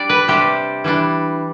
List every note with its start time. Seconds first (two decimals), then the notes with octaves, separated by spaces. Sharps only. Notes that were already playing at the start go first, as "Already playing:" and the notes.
Already playing: G3 D4 D5
0.09 B4
0.28 C3 G3 D4 G4
0.84 E3 G3 D4